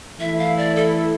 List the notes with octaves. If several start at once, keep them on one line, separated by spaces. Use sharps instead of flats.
E3 A3 E4 E5
F5
D5
A4